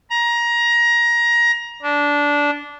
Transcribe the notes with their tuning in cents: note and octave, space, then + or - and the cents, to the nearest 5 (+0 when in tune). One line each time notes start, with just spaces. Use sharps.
A#5 +20
D4 -15